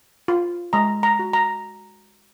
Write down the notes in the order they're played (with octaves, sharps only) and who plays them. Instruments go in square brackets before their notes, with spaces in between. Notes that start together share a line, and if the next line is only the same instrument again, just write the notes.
[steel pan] F4
G#3 A#5
A#5
F#4
A#5